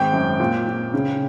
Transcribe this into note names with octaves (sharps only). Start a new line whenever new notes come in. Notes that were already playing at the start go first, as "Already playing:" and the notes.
Already playing: G#1 G#3 G5
F#2
A#2
A#2
C#3